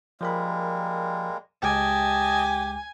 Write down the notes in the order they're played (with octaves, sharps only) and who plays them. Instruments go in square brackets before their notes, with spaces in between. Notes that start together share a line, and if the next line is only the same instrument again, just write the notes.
[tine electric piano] F3 A#4 B5 [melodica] G3 G#3 A#3
[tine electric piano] C#2 G#3 D6 [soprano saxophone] G4 [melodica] D#5 A5 [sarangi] G#5